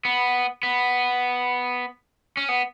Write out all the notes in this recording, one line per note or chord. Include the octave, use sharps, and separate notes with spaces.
B3
B3
C#4
B3